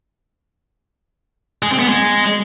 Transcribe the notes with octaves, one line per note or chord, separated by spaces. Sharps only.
G#3
C4
B3
G#3